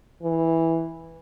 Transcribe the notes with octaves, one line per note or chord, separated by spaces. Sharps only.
E3